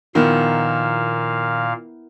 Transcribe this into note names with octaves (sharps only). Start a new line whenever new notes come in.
A#2 D#3 F3 B3 E4 A#4 F5